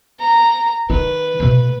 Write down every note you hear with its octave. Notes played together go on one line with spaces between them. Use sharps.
A#5
D#3 B4
B2 A3